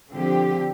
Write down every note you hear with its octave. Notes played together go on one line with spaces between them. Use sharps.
D3 F3 C4 G4